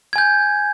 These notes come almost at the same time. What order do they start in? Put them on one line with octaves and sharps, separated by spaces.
G#6 G#5 G6